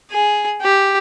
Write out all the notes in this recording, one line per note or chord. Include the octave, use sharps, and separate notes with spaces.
G#4
G4